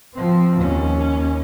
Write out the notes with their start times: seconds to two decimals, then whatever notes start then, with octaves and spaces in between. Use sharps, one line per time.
0.15 F3 C4
0.57 D#2 C#4